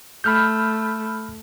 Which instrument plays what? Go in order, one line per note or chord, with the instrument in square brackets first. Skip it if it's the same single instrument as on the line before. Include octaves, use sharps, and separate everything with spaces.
[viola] A3 [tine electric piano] B5 F6 G6